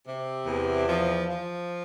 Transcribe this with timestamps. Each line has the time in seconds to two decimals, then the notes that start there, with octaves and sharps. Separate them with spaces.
0.06 C3
0.47 E2
0.88 F3
1.28 F3